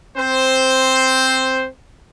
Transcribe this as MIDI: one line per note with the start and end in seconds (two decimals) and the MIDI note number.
0.17 1.66 60
0.17 1.66 72